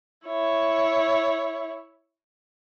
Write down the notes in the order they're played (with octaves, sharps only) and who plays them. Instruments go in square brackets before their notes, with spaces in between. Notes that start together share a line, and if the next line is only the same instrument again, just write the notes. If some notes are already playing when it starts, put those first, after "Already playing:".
[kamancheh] E4 C#5